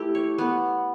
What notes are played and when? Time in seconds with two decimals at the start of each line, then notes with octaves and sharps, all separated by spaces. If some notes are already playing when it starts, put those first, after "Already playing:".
Already playing: A3 E4 G4
0.15 C#5
0.38 B3